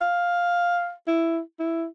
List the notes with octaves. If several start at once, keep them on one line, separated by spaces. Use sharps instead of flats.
F5
E4
E4